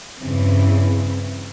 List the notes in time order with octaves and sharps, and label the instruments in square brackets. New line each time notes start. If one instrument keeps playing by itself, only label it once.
[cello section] E2 G2 C#3 E3 C4 E4